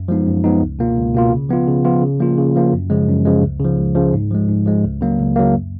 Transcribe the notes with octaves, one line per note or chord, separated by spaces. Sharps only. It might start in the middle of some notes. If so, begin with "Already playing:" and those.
Already playing: F#2
F3 G#3 B3 D#4
F#2
F3 G#3 B3 D#4
C#2
B2 A#3 F4
C#2
B2 A#3 F4
C#3
F3 B3 F4
C#3
F3 B3 F4
C#3
F3 A#3 F4
C#3
F3 A#3 F4
F#2
C#3 F3 G#3
F#2
C#3 F3 G#3
C#2
C#3 F3
C#2
C#3 F3
G#2
F3 G#3
G#2
F3 G#3
C#2
C#3 F#3 A#3
C#2
C#3 F#3 A#3
F#2